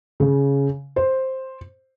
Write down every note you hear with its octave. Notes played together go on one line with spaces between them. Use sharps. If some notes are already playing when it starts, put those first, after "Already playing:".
C#3
C5